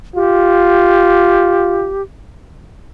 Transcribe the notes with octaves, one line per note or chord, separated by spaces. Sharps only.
F4 G4